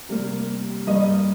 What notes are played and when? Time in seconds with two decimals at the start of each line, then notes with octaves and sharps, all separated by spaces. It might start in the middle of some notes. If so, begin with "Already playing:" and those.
0.09 C3 G3 A#3
0.87 G2 G3 A#3 D#5